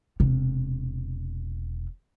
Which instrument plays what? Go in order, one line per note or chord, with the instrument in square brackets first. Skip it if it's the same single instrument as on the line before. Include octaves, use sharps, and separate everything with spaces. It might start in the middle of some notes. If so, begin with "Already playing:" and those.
[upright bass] E1 C3